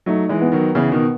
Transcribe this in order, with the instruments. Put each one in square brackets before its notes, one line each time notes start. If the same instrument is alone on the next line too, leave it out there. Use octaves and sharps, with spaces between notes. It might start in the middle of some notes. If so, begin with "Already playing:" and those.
[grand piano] F#3 A3 [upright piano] D#4
[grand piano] E3 G#3
[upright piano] B3
[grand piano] D#3 F#3
[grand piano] C#3 E3 [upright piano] B3
[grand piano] B2 D#3